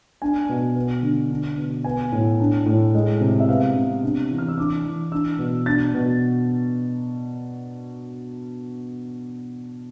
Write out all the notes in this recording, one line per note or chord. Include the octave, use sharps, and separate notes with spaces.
D4 G#5
B2
B3
D3
D4
B2
B3 G#5
A2
D4
A2
G#3
C3
E5
B3 F5
C3
D4
E3
F6
E6
D4 D6
E3
D4 E6
B2
D4 A6
B2